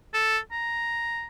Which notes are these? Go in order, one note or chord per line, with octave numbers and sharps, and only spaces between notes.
A4
A#5